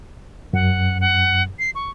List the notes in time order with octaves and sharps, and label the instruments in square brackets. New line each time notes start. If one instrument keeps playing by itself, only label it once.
[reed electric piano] F#2 [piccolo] F#5
[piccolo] F#5
C7
C#6